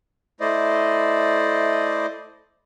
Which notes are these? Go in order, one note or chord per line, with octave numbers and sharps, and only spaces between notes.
A3 E4 C5 D5 D#5